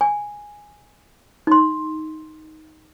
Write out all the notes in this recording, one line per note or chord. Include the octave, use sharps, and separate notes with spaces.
G#5
D#4 C6